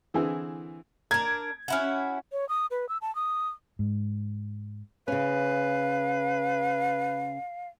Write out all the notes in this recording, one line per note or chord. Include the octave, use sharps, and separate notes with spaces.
D3 E3 C4 E4 G#4
D4 A#4 G#6
C#4 E4 F#4
C#5
D#6
B4
E6
A5
D#6
G#2
C#3 C#4 B4 F5